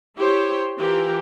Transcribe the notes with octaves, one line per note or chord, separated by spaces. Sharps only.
E4 G4 C5 C#5
E3 F4 G4 A#4